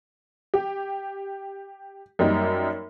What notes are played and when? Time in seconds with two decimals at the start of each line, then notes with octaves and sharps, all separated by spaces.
0.54 G4
2.19 F#2 G3 A#3 D#4